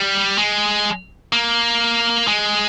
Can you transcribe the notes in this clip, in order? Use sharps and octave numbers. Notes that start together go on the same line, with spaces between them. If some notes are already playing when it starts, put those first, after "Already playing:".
Already playing: G3
G#3
A#3
G#3